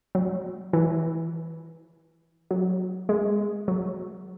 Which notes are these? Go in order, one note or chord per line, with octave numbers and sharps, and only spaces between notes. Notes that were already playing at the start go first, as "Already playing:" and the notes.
F#3
E3
F#3
G#3
F#3